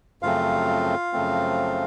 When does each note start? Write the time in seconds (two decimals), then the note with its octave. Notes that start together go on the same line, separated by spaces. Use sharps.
0.22 F#2 C#3 F3 A3 C4 F4 F5
1.13 F#2 C#3 F3 A3 C4